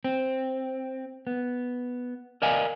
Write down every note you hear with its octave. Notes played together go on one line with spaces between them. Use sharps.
C4
B3
A#4 D5 D#5 F5 G#5